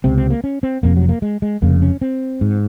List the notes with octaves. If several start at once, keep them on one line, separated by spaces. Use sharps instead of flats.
C#2 C3 C4
C4
A#3
C#4
C4
F1 F2 C3 A#3
F#3
A#3
G#3
G#3
F1 F2 C#3 A#3
C#4
C4
G#2